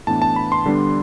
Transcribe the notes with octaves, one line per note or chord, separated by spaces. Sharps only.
A2 E3 B3 D4 A5
A5
B5
C6
D3 G3 B3 D4